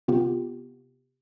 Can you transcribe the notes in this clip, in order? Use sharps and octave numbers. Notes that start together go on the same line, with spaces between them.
C3 B3 F4 G4